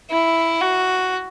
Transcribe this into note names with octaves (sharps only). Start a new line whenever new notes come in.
E4
F#4